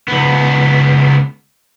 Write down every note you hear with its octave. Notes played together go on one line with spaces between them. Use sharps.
C#2 B3